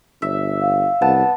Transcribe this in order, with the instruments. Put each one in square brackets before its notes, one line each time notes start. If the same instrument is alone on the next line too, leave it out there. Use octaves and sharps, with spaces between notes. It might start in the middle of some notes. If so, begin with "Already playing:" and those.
[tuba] G1 [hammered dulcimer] E5
[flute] F5
[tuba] C2 [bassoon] B3 [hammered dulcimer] A5